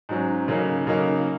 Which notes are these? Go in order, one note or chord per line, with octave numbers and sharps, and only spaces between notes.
G#2 F#3 C#4
C#3 F#3 A#3 D#4
C#3 F#3 A#3 D#4